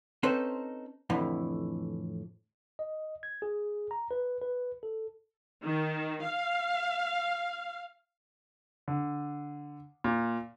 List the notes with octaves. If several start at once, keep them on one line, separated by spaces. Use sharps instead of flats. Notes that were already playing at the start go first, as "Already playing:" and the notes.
C4 C#4 D#4 A4 B4 C5
F2 A2 D3 E3
D#5
G#6
G#4
A#5
B4
B4
A4
D#3
F5
D3
A#2